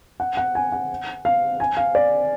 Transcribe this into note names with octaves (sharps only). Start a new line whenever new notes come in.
F#5
F#5
G#5
F#5
F5
G#5
F5
D5